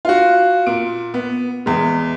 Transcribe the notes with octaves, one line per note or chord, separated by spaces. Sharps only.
F4 F#4
A#2 D7
B3
E2 G#3